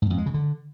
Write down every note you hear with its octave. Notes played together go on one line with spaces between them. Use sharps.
G#2
F2
G#3
C#3
D3